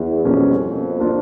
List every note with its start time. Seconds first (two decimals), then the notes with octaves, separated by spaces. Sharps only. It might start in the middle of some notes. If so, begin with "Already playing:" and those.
Already playing: E2
0.25 F2 B2 G3 A#3 C#4
0.99 A#3 D4 F4